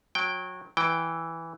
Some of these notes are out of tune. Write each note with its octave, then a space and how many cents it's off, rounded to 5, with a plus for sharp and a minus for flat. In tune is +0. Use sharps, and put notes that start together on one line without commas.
F#3 -25 G5 +0
E3 +0 G5 +0